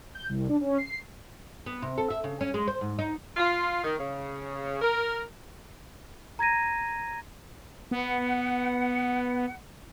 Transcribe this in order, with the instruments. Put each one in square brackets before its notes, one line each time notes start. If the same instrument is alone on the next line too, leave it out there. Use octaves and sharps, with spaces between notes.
[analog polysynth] G6
C2
D4
C#4
C7
[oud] B3
C3
A4
E5
C#3
C#4
G#3
C5
G#2
D#4
[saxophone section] F4
D#3
C#3
A#4
[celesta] A#5 G#6 A#6 D#7
[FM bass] B3 [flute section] F#5